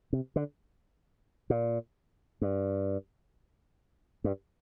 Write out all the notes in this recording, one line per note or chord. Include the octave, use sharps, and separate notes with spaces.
C3
D3
A#2
G2
G2